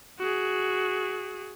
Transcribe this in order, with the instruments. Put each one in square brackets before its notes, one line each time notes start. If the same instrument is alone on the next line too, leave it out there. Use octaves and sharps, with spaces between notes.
[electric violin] F#4 G#4